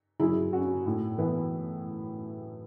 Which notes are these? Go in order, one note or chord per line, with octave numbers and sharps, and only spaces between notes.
F#3 E4 G#4
C#4 F#4
A2
E3 B3 E4